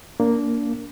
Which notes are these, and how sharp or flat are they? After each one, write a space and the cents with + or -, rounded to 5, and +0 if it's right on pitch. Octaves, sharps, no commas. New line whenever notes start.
A#3 +0 D4 -25